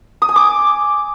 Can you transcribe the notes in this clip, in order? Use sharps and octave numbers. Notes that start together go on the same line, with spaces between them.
D#6
G#5
D6